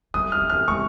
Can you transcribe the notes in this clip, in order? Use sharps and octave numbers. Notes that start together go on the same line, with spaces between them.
G3 D#6
F6
F3
F6
G#3 C#6